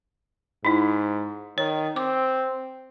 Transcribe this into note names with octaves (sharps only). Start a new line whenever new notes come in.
G#2 D#4 E4
D#3 C#5
C4 D6